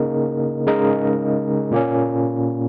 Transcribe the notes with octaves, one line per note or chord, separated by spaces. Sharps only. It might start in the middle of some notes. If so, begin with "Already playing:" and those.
Already playing: C#3 A#3 D#4 A#4 D#5
C#3 G#3 D#4 A#4 D#5
A#2 A#3 C#4